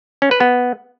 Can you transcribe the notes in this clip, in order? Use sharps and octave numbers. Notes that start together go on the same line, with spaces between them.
C#4
B4
B3